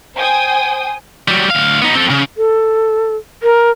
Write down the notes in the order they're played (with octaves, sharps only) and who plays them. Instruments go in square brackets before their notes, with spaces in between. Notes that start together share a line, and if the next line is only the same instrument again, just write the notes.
[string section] C5 G5 G#5 D#6
[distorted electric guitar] F#3 G3
D2 F5
B3 D#4
C4 A4
C#3
[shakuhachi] A4
A#4